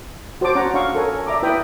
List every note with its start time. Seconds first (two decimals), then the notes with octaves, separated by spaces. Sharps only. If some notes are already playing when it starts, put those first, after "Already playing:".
0.41 F#4 C5 C#5 A5 D6
0.55 C#4 C#5 F#5 A#5
0.74 D4 F5 C#6 E6
0.95 A4 A#4 C#5 G#5
1.27 D5 E5 A#5 D6
1.42 E4 B4 G5 B5 D#6